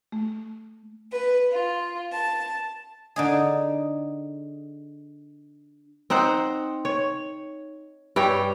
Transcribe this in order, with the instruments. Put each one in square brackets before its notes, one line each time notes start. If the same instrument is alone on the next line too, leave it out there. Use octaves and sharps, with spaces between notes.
[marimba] A3
[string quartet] B4
F4
A5
[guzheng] D3 D#4 G#4
[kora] C4 D#4 C5 F#5
C#5
G2 G3 C#5 G5